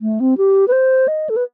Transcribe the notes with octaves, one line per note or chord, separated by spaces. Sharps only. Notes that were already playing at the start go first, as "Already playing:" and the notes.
A3
C4
G4
B4
C5
D#5
A4
B4